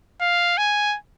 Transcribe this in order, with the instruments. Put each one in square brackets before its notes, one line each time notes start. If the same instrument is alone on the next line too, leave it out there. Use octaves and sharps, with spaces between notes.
[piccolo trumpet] F5
G#5